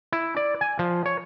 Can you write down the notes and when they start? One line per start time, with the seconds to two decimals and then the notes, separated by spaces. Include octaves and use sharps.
0.12 E4
0.37 D5
0.61 G#5
0.79 F3
1.06 C#5